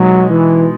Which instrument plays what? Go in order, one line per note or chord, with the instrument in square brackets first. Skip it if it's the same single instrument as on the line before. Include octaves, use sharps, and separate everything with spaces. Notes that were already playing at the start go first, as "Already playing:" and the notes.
Already playing: [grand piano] B2 G#3 D#4 [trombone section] F#3
[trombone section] E3